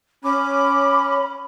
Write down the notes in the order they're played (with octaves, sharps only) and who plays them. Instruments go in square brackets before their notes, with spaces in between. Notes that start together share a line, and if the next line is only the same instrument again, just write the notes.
[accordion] C#4 [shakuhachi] B5 [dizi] D6